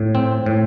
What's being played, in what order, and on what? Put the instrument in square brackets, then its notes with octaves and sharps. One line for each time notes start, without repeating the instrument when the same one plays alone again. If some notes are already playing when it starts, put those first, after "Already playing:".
Already playing: [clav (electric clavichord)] A2
C4
A2